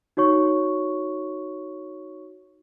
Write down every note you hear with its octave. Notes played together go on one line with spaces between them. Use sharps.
D#4 F#4 C#5 C#6